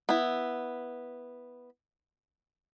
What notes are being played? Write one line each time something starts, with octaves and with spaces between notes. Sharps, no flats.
B3 E4